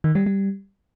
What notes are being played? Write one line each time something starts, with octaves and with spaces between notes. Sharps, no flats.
D#3
G3
G3